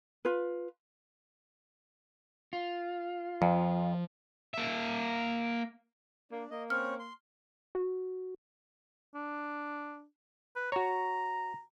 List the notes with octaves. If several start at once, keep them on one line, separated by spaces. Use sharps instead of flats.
F4 B4
F4
F2 F3
A#3 E5
A#3 D4
A#3 D#5
C4 C#4 C#5 F6
C6
F#4
D4
B4
F#4 C#5 A#5